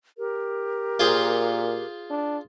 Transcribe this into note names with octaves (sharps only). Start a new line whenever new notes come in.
G4 A#4
A#2 F4 G#4 C5
D4